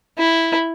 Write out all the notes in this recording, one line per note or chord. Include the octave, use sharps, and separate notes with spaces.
E4